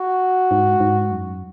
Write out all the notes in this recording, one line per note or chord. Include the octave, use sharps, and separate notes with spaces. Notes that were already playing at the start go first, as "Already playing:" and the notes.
Already playing: F#4
G#2
G#2
F#2